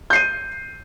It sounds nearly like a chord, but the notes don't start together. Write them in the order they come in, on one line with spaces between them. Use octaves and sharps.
G6 C7 D#7